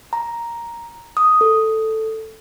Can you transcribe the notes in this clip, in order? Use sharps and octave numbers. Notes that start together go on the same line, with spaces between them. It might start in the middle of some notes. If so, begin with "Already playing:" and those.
A#5
D#6
A4